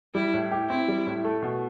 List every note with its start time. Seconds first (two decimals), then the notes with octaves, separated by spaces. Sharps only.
0.15 G3 E4
0.34 A2
0.51 G4
0.69 C4 E4
0.88 G3
1.07 A2
1.24 A3
1.42 B2